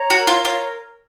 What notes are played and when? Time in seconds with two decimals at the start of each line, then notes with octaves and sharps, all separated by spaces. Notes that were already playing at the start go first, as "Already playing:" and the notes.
Already playing: C#5 A#5
0.10 F#4
0.19 A#4
0.27 F4
0.45 F4 C#5